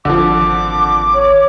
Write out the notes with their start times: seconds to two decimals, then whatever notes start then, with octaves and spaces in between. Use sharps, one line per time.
0.05 G#1 D3 F3 D6
1.14 C#5